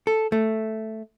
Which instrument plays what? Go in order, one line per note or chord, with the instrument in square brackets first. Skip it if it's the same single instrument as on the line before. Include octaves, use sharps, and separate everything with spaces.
[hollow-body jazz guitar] A4
A3